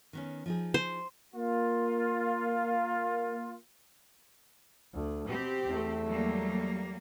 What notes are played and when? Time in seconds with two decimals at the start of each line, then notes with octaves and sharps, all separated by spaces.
0.13 D#3 B3 C#4
0.46 F3 D#4 G#4
0.74 C5
1.35 A#3 F4
4.93 D2
5.28 B2 C4 G4
5.65 E2 A3
6.07 F#3 G3 A#3